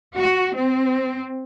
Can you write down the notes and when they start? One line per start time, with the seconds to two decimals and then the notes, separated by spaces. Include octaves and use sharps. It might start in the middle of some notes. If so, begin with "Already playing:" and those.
0.14 F#4
0.53 C4